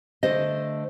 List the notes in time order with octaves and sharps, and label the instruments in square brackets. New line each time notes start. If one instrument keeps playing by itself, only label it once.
[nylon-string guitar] D3 A3 C5 D#5